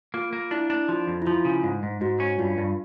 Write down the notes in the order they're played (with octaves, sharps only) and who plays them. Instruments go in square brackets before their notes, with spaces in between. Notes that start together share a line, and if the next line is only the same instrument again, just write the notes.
[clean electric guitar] A#3 [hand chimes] F4
[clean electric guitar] A#3
[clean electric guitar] D4 [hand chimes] E4
[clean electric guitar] D4
[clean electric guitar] F3 [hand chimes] F4
[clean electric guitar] F2
[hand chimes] E4
[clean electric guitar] F3 [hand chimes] F4
[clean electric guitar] C#3
G#2
G#2
[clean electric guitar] G#2 [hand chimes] F#4
[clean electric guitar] C#4
[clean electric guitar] G2 [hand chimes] F4
[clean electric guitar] G2